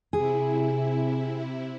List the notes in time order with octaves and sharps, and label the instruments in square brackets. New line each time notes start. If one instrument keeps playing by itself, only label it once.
[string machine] C3 E4 [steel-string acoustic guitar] G#4